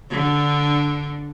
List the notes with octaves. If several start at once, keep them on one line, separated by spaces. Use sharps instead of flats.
D3 D4